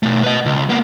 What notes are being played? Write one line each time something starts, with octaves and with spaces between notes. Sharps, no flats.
B2 A3
B4 D#5
C#2
A#3 B3